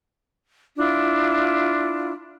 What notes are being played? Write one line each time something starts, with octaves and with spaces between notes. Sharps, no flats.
D4 E4 F4